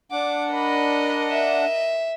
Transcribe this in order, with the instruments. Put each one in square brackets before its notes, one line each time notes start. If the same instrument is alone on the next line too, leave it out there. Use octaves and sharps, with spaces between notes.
[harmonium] D4 F#5 [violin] D6
[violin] A#4 D#5 [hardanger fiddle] B5
[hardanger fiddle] E5